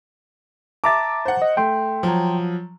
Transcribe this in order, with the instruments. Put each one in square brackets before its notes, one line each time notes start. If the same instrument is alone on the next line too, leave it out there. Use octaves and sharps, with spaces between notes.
[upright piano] E5 D6 [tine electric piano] A5 A#5 A6
[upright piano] C5 F#5
[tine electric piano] D#5
[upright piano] A3 [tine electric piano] G5 C6
[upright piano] F3 F#3